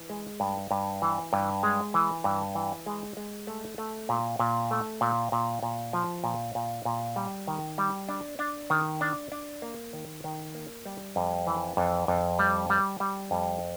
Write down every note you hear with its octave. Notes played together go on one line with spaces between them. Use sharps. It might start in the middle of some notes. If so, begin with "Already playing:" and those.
Already playing: E3
G#3
G2
G2
E3
G2
G#3
E3
G2
E3
G#3
G#3
A3
A3
A#2
A#2
A3
A#2
A#2
A#2
F3
A#2
A#2
A#2
G3
D#3
G3
D4
D4
D#3
D4
D4
A#3
D#3
D#3
A#3
G3
F2
E3
F2
F2
G3
G3
G3
F2